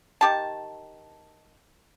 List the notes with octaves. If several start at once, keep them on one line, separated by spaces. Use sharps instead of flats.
D#3 G4 A5